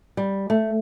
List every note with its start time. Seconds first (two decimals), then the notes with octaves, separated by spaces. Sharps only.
0.17 G3
0.50 A3